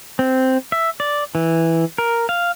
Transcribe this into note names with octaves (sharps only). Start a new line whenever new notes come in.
C4
E5
D5
E3
A#4
F5